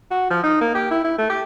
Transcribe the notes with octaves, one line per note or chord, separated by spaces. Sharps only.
F#4
F3
D#4
A#3
G4
E4
E4
A3
G4